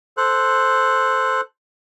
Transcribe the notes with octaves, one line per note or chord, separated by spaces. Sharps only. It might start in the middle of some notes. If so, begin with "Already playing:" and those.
A4 C5 F#6